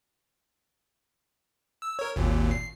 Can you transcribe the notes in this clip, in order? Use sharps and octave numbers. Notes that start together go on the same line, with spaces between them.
E6
A#4 C#5
G#1 D#2 A#2
C7